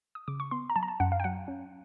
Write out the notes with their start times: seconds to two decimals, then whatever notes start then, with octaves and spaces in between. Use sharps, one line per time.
0.15 D#6
0.28 C#3 D6
0.40 C#6
0.51 B3 C6
0.70 A#5
0.76 F#3 A5
0.83 A#5
0.88 A5
1.00 F#2 F#5
1.12 F5
1.20 G5
1.24 F#3 F#5
1.48 C#4